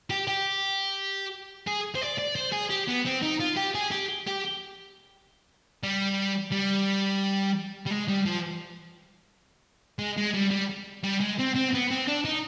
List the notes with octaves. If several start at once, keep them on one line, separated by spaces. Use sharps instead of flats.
G4
G4
G#4
C5
D5
D5
C5
G#4
G4
B3
C4
D#4
F4
G4
G#4
G4
G4
G3
G3
G3
G#3
G3
F3
G#3
G#3
G3
G3
G3
G#3
C4
C4
B3
C4
D4
D#4